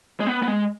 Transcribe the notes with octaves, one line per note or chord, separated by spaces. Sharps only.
G#3
B3
B3
G#3